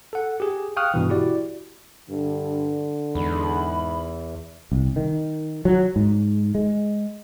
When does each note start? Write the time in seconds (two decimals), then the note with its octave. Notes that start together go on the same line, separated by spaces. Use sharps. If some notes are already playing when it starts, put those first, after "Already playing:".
0.13 A4 F#5
0.40 G4 G#4
0.77 F5 G5 C#6 D#6 F6 F#6
0.94 G2 B2 E3
1.10 E4 F#4 G4 D5
2.10 G2 D3
3.15 E2 G#2 B5
4.72 C2
4.96 D#3
5.65 F#3
5.96 G#2
6.55 G#3